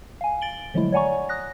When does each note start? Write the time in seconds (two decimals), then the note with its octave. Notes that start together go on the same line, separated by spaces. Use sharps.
0.21 F5 G#5
0.42 A6 D7 F#7 G7
0.74 D3 F3 F#3 G#3 A3 E4
0.92 C#5 D5 F#5 G#5 A#5 C#6
1.29 D#6 F#6 A#6